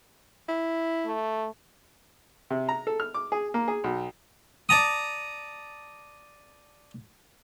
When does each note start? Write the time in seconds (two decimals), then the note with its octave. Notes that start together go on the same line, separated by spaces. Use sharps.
0.49 E4
1.06 A3
2.50 C3
2.69 A#5
2.87 A4
3.00 F6
3.14 D6
3.32 G#4
3.54 A#3
3.68 G#4
3.84 B1
4.69 D5 A5 A#5 D#6